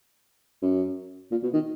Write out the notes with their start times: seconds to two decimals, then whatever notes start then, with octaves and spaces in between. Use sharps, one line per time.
0.62 F#2
1.31 A#2
1.43 B2
1.53 D#3